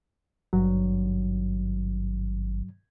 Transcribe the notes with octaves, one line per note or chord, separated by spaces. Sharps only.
G#1 G2 F#3